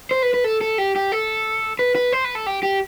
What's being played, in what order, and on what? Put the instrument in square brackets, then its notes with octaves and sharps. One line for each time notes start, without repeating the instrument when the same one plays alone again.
[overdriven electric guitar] C5
B4
B4
A4
A4
G4
G4
A4
B4
B4
C5
B4
A4
G4
G4